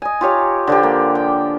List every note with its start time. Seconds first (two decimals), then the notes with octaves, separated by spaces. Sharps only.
0.02 D#5 G#5
0.21 F4 G4 C#5 A#5
0.67 D3 F3 G4
0.83 A#3
1.15 G5